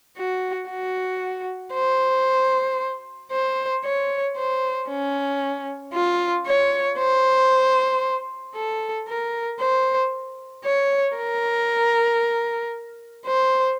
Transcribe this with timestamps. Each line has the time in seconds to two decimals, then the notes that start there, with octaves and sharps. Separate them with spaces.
0.17 F#4
0.70 F#4
1.75 C5
3.32 C5
3.84 C#5
4.37 C5
4.89 C#4
5.93 F4
6.46 C#5
6.99 C5
8.55 A4
9.08 A#4
9.60 C5
10.65 C#5
11.17 A#4
13.27 C5